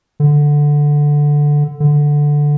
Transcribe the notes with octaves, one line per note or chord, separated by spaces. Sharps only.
D3
D3